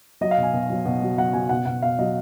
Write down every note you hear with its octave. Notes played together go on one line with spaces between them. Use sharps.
F#3 D#5
F5
B2
G#5
B2
F#3
B2
F#3
F#3 F#5
F#3 G#5
B2 F#5
B2 F#5
B2 F5
F#3 D#5